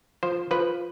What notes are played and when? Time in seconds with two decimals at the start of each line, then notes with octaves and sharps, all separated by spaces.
0.23 F3 C5
0.51 F3 B4